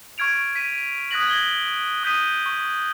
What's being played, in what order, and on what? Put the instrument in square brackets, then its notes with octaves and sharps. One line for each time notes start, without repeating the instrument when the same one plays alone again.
[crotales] C#6 F6 G#6 D7 F7
B6 D#7
D#6 F#6 G#6 A#6 B6 F#7
G#6 A#6 G7
D#6 G6 B6 D#7
C#6